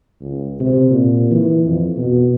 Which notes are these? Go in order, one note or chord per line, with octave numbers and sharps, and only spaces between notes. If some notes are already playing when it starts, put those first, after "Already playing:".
C#2
C3
A#2
E3
F2
B2